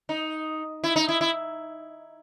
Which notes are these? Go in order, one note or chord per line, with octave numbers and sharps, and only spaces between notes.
D#4
E4
D#4
E4
E4